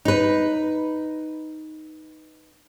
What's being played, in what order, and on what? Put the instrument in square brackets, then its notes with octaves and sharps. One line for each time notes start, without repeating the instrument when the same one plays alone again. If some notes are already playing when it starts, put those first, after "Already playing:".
[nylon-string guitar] D#4 B4